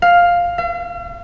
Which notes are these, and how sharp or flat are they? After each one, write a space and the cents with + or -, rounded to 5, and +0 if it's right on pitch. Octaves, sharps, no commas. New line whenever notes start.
F5 +5
F5 -45